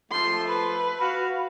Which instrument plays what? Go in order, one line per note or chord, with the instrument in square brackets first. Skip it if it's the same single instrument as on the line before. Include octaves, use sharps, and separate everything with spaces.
[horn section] F3 A3 A4 [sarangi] C6
[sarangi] B4
[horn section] F#4 F5